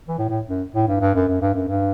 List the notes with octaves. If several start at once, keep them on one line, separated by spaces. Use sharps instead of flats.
E3
A2
A2
F#2
A2
G2
G2
F#2
F#2
G2
F#2
G2